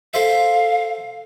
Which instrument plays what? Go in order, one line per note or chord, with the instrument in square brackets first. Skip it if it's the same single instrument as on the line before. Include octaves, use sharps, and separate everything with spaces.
[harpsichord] A4 C5 E5 [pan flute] F5